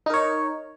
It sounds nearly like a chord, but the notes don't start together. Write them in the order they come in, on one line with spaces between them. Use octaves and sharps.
D#4 A#4 C#5